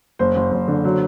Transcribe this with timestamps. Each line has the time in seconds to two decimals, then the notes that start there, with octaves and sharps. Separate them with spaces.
0.19 F#1 C5
0.35 F#1
0.52 F#1
0.68 D3
0.84 F#3